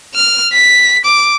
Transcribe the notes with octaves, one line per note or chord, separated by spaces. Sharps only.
F6
B6
D6